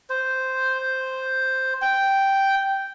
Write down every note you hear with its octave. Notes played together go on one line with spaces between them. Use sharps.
C5
G5